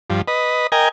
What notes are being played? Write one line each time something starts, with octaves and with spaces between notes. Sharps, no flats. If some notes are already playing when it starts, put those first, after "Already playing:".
G2 F3
B4 D#5
A#4 D#5 G5 G#5